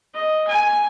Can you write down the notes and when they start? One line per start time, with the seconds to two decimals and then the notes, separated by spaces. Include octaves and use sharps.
0.14 D#5
0.47 G#5